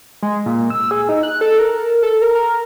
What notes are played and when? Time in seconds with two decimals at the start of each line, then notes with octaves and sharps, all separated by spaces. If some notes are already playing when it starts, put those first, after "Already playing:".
0.22 G#3
0.46 A#2
0.70 E6
0.91 G#4
1.09 D#4
1.23 F#6
1.41 A4
1.59 A#4
2.02 A4
2.22 A#4
2.35 A#4